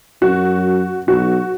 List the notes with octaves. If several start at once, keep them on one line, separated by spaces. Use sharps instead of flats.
F#2 F#4
B1 F#4